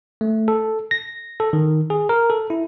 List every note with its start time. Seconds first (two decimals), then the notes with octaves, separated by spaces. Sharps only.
0.21 A3
0.48 A4
0.91 A#6
1.40 A4
1.53 D#3
1.90 G#4
2.09 A#4
2.30 A4
2.50 E4